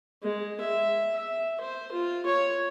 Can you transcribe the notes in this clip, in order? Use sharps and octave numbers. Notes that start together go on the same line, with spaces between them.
G#3
E5
E5
C5
F4
C#5